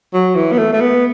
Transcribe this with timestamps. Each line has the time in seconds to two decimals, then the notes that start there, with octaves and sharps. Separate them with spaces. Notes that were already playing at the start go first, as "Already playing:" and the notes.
0.13 F#3
0.35 E3
0.53 B3
0.58 A3
0.73 A3
0.81 B3